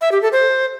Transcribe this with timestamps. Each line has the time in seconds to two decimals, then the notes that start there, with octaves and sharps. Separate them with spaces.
0.01 E5
0.12 G4
0.22 A4
0.32 C5